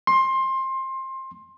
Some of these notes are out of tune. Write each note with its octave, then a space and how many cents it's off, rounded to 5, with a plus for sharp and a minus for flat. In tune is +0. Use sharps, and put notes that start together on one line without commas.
C6 +20